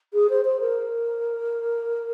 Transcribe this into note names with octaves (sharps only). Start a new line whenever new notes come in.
G#4
C5
C5
A#4